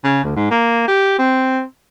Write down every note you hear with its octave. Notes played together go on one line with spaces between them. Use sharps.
C#3
D2
G#2
A#3
G4
C4